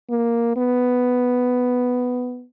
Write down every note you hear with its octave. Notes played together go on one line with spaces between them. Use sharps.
A#3
B3